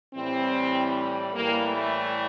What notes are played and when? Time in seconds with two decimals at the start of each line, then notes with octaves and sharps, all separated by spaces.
0.14 A2 E3 G3 C4
1.34 A2 E3 G3 A#3
1.65 A3